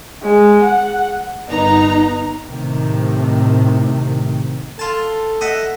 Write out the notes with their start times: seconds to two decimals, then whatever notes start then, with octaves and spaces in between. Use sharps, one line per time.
0.23 G#3
0.64 F#5
1.49 G1 B3 D#4 A#5
2.46 A2 C3 D#3 A3
4.79 F4 A4 A5
5.41 D#5 E5 F#5